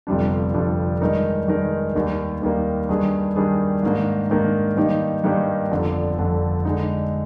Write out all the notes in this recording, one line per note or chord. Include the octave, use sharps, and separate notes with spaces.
G1 F2 C3 G3 D4
G1 F2 C3 G3 D4
G2 D#3 G#3 D#4 A#4
G2 D#3 G#3 D#4 A#4
D#2 D#3 G3 A#3
D#2 D#3 G3 A#3
G2 D#3 G3 D4 G#4
G2 D#3 G3 D4 G#4
G#2 D#3 A#3 D4
G#2 D#3 A#3 D4
G2 D#3 A#3 D#4 G4
G2 D#3 A#3 D#4 G4
G1 F2 D3
G1 F2 D3
D3 G#3 D#4